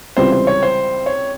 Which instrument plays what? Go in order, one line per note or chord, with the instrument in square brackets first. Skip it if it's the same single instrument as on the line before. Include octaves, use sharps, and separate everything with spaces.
[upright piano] C#2 C3 E3 G3 C4 [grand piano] C5
[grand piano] C5
C#5
C5
C#5